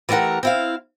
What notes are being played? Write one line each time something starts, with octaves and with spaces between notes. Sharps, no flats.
E3 A3 G4 A#4 F#5
C4 E4 F5